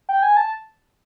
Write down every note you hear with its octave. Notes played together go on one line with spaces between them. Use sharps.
G5
G#5
A5